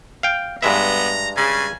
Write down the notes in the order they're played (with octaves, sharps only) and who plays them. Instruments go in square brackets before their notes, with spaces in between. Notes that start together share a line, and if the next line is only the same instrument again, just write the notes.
[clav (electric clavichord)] F5 G5
[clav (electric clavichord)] G2 G#3 E5 [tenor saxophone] B3 [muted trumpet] A#5
[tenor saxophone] C#3 [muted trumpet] G#5